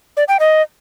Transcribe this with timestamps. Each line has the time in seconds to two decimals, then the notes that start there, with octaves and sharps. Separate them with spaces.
0.17 D5
0.28 G5
0.40 D#5